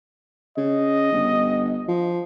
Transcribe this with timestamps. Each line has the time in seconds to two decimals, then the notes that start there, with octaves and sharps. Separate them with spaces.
0.57 C#3 D#5
1.13 G1
1.88 F3